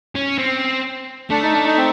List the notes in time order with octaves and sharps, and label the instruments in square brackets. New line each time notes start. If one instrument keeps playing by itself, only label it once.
[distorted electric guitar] C#4
C4
[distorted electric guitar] A3 [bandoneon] D4
[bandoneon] D#4
D4
D#4
C4